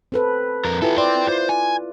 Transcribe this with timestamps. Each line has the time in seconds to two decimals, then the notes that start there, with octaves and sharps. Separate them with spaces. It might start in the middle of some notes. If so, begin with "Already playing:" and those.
0.12 C4 A4 B4
0.65 F2 A#4
0.82 E4 F4 G4 A4 B4
0.98 D5 G5 C6
1.28 F4 C5
1.49 G#5